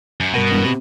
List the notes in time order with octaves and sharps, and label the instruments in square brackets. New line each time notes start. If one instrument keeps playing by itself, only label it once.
[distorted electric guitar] F#2
[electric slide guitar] G2 A#4 F#5 [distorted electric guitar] B2
[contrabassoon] E1
C3